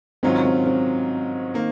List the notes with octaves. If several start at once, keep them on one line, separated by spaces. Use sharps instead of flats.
G#2 D#3 F#3 C4 C#4 F4
C4
C4
D#3 A#3